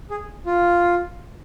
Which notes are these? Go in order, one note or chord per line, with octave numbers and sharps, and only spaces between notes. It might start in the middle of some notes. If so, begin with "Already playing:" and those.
G#4
F4